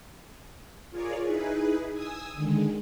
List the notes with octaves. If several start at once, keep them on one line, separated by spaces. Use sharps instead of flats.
F4 G#4 A#4 C#5 D5
D#4 E4 G#4 B4
G#5 D#6 E6
D3 D#3 G#3